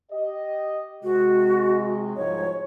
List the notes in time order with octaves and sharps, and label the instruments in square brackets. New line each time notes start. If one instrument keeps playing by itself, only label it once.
[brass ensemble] G4 D#5
[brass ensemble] C3 G#3 [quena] F#4
[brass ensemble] C2 G#2 F3 [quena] C#5